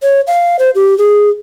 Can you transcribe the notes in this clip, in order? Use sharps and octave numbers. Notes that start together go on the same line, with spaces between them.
C#5
F5
C5
G4
G#4